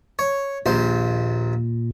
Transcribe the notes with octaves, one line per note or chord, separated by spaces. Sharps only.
C#5
A#1 D#2 A#2 C5